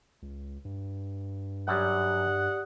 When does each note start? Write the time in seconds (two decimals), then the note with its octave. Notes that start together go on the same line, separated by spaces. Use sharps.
0.22 C#2
0.65 G2
1.68 F#2 F#3 G3 G4 D5 F#5 D#6